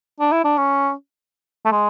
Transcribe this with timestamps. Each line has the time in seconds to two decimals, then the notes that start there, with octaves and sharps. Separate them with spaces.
0.20 D4
0.32 E4
0.44 D4
0.58 C#4
1.65 A3
1.72 G#3